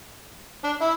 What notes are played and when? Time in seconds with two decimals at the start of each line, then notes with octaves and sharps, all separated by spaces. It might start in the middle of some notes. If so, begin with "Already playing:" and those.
0.64 D4
0.81 E4